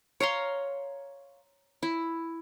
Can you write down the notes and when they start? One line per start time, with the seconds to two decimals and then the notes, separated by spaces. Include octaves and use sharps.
0.20 C#5 F5 A#5 C6
1.83 E4